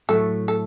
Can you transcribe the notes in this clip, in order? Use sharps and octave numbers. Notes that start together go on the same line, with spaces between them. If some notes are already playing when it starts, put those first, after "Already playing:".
A2 F#3 A3 A4
A4